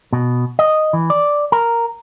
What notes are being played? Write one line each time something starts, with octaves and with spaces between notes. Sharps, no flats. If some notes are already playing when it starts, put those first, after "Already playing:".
B2
D#5
E3
D5
A#4